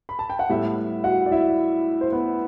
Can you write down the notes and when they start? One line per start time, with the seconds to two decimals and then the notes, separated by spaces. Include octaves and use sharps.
0.09 B5
0.19 A5
0.30 G5
0.39 F#5
0.50 A2 G3 B3 E4 E5
1.04 F#4 F#5
1.26 D5
1.32 E4 E5
2.01 C5
2.12 B3 B4